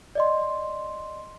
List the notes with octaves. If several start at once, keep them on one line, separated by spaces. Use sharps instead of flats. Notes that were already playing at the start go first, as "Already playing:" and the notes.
D5 D#5 C6